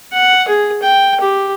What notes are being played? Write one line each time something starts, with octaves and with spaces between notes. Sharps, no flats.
F#5
G#4
G5
G4